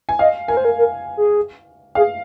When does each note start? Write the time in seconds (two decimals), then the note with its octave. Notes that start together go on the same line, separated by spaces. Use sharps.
0.09 G#5
0.19 D#5 F5
0.48 A#4 G#5
0.57 C5
0.65 A#4
0.78 A#4
1.17 G#4
1.95 G#4 F5